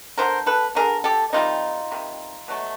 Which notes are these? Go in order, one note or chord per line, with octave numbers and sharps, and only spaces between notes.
D3 G3 B3 A#4 C5
A4 B4
D3 G3 B3 G#4 A#4
G4 A4
C3 D#3 G3 D#4 F4
C3 D#3 G3
B2 F#3 A3